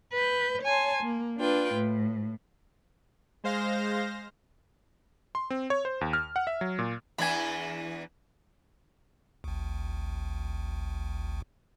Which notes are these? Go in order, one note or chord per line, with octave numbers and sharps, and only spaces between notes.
B4 G6
C#5 G#5 A5 C6
A#3
D4 F4 B4 G5
A2
G#3 C5 F5 A#6
C6
C4
C#5
C5
D#2
F6
F#5
E5
F#3
A#2
E2 E3 D4 G#5 B5
G#1 D2